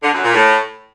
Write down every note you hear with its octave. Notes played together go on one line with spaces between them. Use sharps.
D3
F#2
A#2
A2